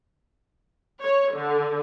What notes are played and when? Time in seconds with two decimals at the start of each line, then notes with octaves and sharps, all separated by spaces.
1.02 C#5
1.35 D3